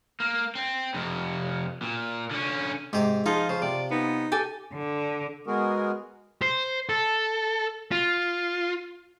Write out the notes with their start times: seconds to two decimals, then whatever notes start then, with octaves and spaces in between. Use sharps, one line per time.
0.20 A#3
0.55 C4
0.94 F2 C3
1.82 A#2
2.31 D3 C#4
2.93 G#2 C3 G4
3.26 F3 D#4 F4 G#4
3.49 C#3 C5
3.62 C3 D5
3.91 B3 D#4
4.32 G4 A4 G#5
4.74 D3
5.47 G#3 B3 F#4 G#4 A#4
6.42 C5
6.89 A4
7.92 F4